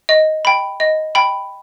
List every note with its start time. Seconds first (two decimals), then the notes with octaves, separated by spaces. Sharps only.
0.09 D#5
0.45 G5 B5
0.80 D#5
1.15 G5 B5